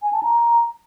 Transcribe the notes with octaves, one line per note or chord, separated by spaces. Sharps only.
G#5
A5
A#5